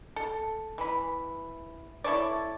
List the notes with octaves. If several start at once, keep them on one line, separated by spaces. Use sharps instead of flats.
A4
E3 B5
E4 A4 C#5 D5